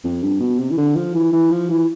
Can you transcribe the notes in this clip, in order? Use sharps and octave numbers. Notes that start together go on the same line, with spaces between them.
F2
G2
B2
C3
E3
D3
F3
E3
E3
F3
E3